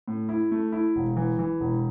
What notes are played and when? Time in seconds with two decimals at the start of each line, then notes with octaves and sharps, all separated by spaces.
0.08 A2
0.29 E4
0.51 A3
0.72 E4
0.96 E1
1.17 E3
1.39 E3
1.60 E1